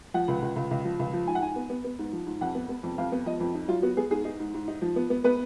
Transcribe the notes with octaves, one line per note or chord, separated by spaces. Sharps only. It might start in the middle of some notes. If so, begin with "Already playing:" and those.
F3 F#5
C#2
C#2
C#2
C#2
F3
C#2
F3
G#2 G#5
F#5
G#2 G#5
B3
B3
B3
G#2
F3
G#2
F2 F#5
B3
B3
F2
F2 F5
B3
F3 D#5
F2
D#4
F#3 F4
B3 F#4
B3 G#4
G#2 G#4
D#4
G#2
G#2
D#4
F3
B3
B3
B3 B4